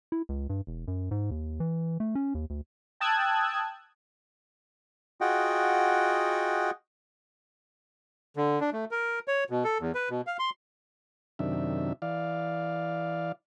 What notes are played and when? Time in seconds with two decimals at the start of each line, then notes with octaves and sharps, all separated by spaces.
0.12 E4
0.29 C#2
0.50 G2
0.67 E1
0.88 F#2
1.11 G#2
1.31 D#2
1.60 E3
2.00 A3
2.15 C#4
2.35 D#2
2.50 D2
3.00 G5 A5 D#6 E6 F#6 G#6
5.21 F4 F#4 G#4 D#5 F#5 G5
8.37 D3
8.61 D4
8.73 A3
8.91 A#4
9.28 C#5
9.50 B2
9.64 A4
9.80 E2
9.95 B4
10.10 B2
10.27 F5
10.39 C6
11.39 F#2 C3 D#3 D4 E5
12.02 E3 D5 F5